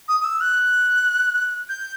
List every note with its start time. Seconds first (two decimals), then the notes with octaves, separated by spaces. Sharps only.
0.08 D#6
0.20 D#6
0.24 E6
0.41 F#6
1.69 G6